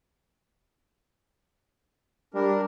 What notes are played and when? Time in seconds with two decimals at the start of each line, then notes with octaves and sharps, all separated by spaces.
2.34 G3 D4 A#4